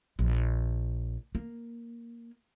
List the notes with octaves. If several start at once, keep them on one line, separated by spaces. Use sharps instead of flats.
A#1
A#3